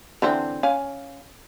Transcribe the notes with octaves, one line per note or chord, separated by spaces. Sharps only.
D3 E3 C4
C#4 F5 G#5